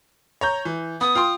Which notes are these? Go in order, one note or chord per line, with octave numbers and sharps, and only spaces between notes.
C#5 A#5 G6
E3
B3 D#6
F4 G5 C6